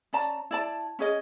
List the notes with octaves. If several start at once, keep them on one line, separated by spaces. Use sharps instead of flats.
C#4 D5 A5 A#5
E4 D5 A5
C#4 G#4 D#5